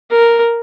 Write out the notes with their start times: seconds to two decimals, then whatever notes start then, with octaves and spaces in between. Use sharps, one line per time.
0.11 A#4